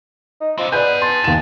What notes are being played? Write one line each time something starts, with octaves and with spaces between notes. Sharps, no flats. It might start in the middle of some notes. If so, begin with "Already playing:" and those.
D#4
F3 C4 D4
B3 D#4 B4 D5 G#5 G6
A5 C6
D#2 E7